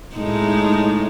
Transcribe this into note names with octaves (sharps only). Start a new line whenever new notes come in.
A2 G#3 D#4